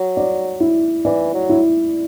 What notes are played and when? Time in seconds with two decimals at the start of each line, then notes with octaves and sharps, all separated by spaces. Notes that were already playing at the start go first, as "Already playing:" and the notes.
Already playing: F#3
0.17 D5
0.60 E4
1.05 E3 D5
1.34 F#3
1.49 E4